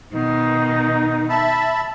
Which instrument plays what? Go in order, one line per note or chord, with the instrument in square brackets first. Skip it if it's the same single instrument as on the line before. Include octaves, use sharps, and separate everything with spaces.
[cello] B2 D#3 [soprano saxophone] D#4
[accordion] E5 A5 B5